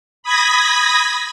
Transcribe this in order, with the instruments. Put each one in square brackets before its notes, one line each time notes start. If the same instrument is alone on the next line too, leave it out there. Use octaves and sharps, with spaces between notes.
[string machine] B5 D#6 G#6 A#6 B6